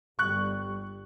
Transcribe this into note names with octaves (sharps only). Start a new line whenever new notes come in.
G1 G3 C#6 F#6